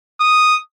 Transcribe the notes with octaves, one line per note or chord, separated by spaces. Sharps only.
D#6